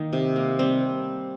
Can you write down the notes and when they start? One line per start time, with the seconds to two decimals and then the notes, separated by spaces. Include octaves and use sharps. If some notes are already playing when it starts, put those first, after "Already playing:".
Already playing: D#3 A#3 D#4
0.13 C3
0.36 A#3
0.59 G3 C4